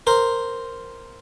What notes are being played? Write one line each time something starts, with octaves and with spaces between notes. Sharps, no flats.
A#4 C5